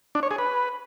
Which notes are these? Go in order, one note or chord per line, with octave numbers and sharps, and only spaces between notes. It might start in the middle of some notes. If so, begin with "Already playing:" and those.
D4
C#5
G#4
B4